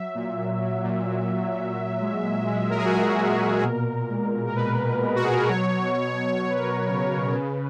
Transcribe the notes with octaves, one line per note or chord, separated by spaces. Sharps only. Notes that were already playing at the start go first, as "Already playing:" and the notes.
Already playing: F#3 E5
A#2
F#3
F#3
A#2
F#3
A#2
F#3
A#2
G#3
A#2
G#3
A#2 A#4
G#4
F#4
A#2 G#4
G#3
A#2
G#4
B2 A#4
B2
G#3
B2
A#4
G#3 B4
B2
G#3
F#4
B2 G#4
A#4
B4
F#3 C#5
F#3
F#3
F#3
F#3 C#5
B4
A#4
F#3 B4
C#3
C#3
C#3